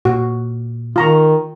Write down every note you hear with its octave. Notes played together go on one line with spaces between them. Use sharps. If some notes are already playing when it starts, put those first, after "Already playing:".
A#2 F#4
D#3 F4 A#5 C#6